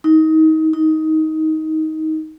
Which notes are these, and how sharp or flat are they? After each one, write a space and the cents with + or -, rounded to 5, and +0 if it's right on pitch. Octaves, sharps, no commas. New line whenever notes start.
D#4 +25
D#4 +15